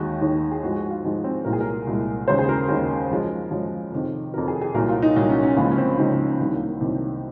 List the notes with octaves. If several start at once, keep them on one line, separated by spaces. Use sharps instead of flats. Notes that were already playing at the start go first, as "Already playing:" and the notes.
Already playing: D#2 D#3 G#3 F#4
D#2 D#3 G#3
G#4
G#2 F3 G#3 F#4
G#4
F#4
F4
G#2 F3 G#3 D#4
C4
C2 A#2 G#3 A#4
G#4
A#4
C2 A#2 G#3
D#2 C#3 G#3 C5
G#4
A#4
D#2 C#3 G#3 A#4
F#2 F3 G#3
F#2 F3 G#3
F2 C3 D#3
F2 C3 D#3 A#4
G#4
G#4
C2 A#2 F#3 A#4
F4
D#4
C2 A#2 F#3 D#4
C#4
C#4
C#2 C#3 F3 G#3 A#3
C#4
C4
C#2 C#3 F3 G#3 D#4
C#4
A#3
C2 C3 D#3 F#3
A#3
C2 C3 D#3 F#3